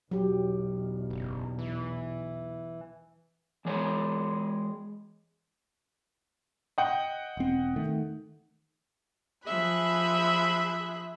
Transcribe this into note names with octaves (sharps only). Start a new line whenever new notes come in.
B1 E2 F#3 G4
F#1
E3
E3 G#3 G#4 C#5
D#5 F#5 G5
E1 C4
D#3 A3
F3 G#4 E5 B5 F#6